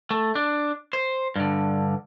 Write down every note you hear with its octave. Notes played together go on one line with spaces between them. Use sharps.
A3
D4
C5
G2 D3